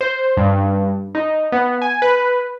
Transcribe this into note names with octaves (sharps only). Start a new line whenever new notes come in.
C5
G2
D#4
B3
G#5
B4